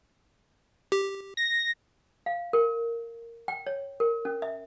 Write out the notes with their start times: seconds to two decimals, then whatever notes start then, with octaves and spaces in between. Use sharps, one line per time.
0.92 G4
1.37 A#6
2.26 F5
2.53 A#4
3.48 G5
3.67 C#5
4.00 A#4
4.25 C#4
4.42 E5